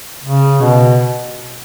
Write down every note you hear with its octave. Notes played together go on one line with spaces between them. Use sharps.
C#3
B2